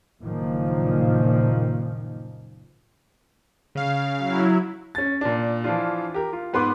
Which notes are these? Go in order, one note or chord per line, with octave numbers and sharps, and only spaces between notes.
F#1 A#2 D#3 F3
C#3 F5
F#3 E4
C#4 A6
A#2 D4
E3 F3 D4 F4
G4 A#4
F4
G#2 B3 B4 C6 D6